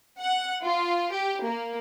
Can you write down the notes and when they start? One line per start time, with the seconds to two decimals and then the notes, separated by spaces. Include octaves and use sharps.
0.19 F#5
0.64 F4
1.13 G4
1.45 A#3